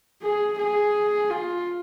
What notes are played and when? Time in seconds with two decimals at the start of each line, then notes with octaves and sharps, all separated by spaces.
0.22 G#4
0.58 G#4
1.30 F4